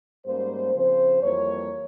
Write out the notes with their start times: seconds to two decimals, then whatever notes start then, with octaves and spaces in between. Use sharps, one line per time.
0.25 G#2 G3 A#3 C#4 C5
0.74 C#3 F3 C4 C5
1.22 F2 E3 G3 A#3 C#5